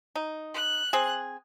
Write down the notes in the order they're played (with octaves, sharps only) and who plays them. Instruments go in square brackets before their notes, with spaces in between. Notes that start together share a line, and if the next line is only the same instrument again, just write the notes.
[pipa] D#4
[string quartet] F#6
[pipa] C4 G#4